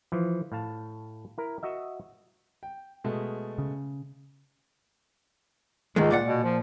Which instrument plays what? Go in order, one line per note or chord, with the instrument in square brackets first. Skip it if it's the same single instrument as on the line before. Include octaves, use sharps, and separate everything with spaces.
[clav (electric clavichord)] E3 F3
A2 F5 A5
E4 A#4
F#4 D#5 E5
[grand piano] G5
B2 G#3 A3
[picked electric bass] C#3
[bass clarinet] C#2 [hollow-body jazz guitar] G#2 D#3 G#3
[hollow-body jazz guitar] A#2 D5 F#5
[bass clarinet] B2
F3